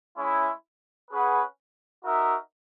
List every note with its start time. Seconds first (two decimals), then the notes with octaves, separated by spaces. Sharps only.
0.16 G#3 C#4 E4
1.09 C#4 G#4 B4 F#5
2.02 D#4 F#4 A#4 E5